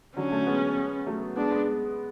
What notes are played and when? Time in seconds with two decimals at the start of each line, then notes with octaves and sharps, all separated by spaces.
0.17 D3 F#3 C#4
0.32 F#3 A3
0.46 G#3 B3
1.06 F#3 A3
1.36 G#3 B3 D4
1.51 G#3 B3